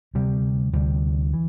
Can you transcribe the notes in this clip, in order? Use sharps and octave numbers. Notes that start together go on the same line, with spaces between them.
D2 C3 G3
D2 C3 G3
E3